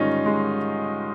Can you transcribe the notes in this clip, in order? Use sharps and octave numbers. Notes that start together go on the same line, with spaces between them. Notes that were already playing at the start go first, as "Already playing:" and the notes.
Already playing: G#2 D#3 G3 C#4 D#4 F4
G#3